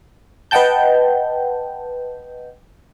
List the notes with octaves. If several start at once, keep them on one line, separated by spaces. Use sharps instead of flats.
B4 D#5 F#5 G5 A5 G6